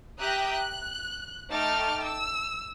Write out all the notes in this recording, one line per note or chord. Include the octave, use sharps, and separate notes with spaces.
G4 E5 G5 A#5 D#6 F#6
F#6
A3 D#4 G5 A5 D6 F6
E6